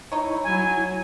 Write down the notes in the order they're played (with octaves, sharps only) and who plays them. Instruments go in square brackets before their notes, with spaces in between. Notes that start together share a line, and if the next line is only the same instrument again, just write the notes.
[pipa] D#4 C#5 [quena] E4
[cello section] F#3 [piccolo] G#5